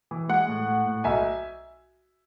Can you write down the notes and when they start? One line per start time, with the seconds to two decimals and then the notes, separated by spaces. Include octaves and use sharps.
0.11 E3
0.29 G#3 F#5
0.48 A2
0.66 A2
0.86 A2
1.04 B1 E5 G#5